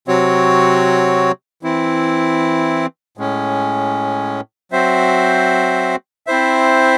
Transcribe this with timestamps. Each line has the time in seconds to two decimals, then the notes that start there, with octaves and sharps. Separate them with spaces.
0.08 C3 F#3 C4 F#4 C#5
1.63 E3 C4 E4
3.17 A2 G#3 C#4
4.71 F#3 C4 F#4 C5 E5
6.27 C4 E4 C5 E5